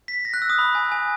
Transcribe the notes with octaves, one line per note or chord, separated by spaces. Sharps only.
B6
A#6
F#6
E6
D#6
B5
G#5
G#5